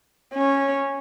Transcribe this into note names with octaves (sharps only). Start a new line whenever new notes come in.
C#4